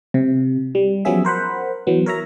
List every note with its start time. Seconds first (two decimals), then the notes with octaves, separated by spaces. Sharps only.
0.14 C3
0.75 G3
1.05 F3 F#3 B3 C#4 G#4 E5
1.25 A#4 C5 F#5 B5
1.87 E3 F#3 B3
2.06 A#4 C#5 E5 A#5